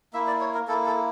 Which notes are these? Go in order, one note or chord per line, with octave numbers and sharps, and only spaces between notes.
A#3 E4 E5
D5
C#5
A#4
A#3 E4 A4
A4